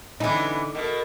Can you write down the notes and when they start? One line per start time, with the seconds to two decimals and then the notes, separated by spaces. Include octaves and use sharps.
0.20 D3 E3 B3 C#4 D#4 E4 A4
0.75 B2 A3 A#4